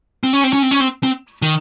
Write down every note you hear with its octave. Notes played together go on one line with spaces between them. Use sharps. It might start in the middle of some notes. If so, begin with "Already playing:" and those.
C4
C#4
C4
C#4
C4
C#4
C4
C4
D#3